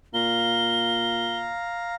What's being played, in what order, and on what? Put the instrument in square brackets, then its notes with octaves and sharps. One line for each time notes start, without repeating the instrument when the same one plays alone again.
[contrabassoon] A#2 [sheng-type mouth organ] F5 A#5 [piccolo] G7